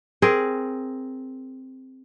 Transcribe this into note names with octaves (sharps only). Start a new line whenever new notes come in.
C4 G#4 A#4